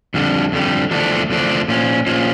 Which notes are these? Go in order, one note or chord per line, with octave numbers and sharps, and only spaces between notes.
F2 D3 G3
F2 D3 G3
E2 D3 F3 A3 D4
E2 D3 F3 A3 D4
A#2 F3 C#4
A#2 F3 C#4